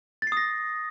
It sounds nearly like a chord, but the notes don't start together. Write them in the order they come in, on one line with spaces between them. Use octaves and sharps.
A6 C7 D#6 A#6